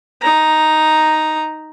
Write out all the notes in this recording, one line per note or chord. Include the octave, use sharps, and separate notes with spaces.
D#4 A#5